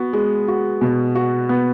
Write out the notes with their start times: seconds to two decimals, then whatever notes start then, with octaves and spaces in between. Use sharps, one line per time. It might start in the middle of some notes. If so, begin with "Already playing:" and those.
Already playing: B3 F#4
0.13 G#3
0.48 F#4
0.81 B2
1.15 F#4
1.49 B3